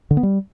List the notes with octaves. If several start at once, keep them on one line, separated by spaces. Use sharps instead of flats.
D3
B3
G3